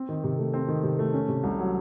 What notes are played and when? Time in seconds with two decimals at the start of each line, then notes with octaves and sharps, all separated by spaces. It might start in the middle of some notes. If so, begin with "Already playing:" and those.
Already playing: C4
0.09 D#3
0.24 C3
0.38 A3
0.54 C4
0.68 D#3
0.83 C3
0.99 A3
1.14 C#4
1.28 C3
1.43 C2
1.59 F#3